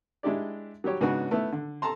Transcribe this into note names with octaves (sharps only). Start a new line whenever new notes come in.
G#3 D4 E4 G4 D5
F#3 G3 G4 C#5
G#2 C#3 B3 C#4 D4 F#4
A3 B3 E4
D3
A4 A5 A#5 C6